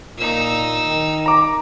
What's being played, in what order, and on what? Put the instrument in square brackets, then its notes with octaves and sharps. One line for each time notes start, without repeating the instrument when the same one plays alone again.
[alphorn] A#2 [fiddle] D#4 E6
[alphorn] D#3
[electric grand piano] A#5 D6